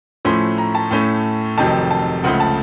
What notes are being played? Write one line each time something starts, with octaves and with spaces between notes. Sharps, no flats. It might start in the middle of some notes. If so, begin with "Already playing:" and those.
A2 F3 A3 C#4 C6
A#5
A5
A2 A3 C#4
F1 F2 C3 D#3 F#3 A5
A5
C#2 C#3 F3 A3 F#5
A5